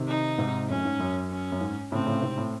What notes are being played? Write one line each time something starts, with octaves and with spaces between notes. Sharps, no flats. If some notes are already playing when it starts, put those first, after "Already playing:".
Already playing: C3 D#3
D#4
G#2 C3
F#2 A2 C#4
G#2
F#2
C#4
F#2
G#2
A2 C#3 C4
A2 C#3
G#2 C3
A2